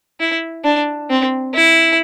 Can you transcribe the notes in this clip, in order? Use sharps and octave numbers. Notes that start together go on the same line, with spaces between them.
E4
D4
C4
E4